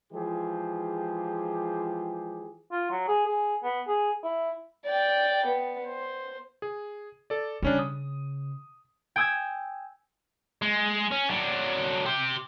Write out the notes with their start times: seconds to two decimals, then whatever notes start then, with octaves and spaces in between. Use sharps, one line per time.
0.13 E3 F3 G#3 G4 G#4
2.72 F4
2.91 F#3
3.08 G#4
3.26 G#4
3.64 B3
3.88 G#4
4.24 E4
4.86 D5 G5
5.46 B3
5.85 C5
6.62 G#4
7.30 A4 D5
7.62 C#3 G3 C#4 D4
7.79 D#6
9.16 G5 G#5 D#6 E6 G6 G#6
10.62 G#3
11.11 C#4
11.30 F#3 D4
12.05 G4 C5